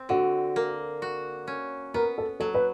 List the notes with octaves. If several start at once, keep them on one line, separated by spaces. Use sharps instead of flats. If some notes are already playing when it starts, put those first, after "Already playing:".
Already playing: C4
D3 F#4
A#3
F#4
C#4
B3 A#4
A4
F#3 A4
B4